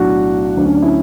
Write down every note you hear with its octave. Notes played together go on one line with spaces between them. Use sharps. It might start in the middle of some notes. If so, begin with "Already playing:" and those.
Already playing: B1 A2 F#3 D4 F#4
D2 D3 F#3 D4
C#4
D4
C#4 E4